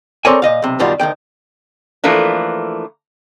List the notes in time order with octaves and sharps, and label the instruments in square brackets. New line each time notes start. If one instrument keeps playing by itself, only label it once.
[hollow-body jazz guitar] C4 A4 A#4 C#5 D5 G#5
A#2 D#5 F5
B1 C3
F#2 B2 D#3 G3 F4
D2 C3 D#3 G5
[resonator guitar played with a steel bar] E3 F3 A3 A#3 D4